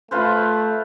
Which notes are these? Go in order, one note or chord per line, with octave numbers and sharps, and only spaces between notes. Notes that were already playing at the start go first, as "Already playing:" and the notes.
A3 F4 B4 C5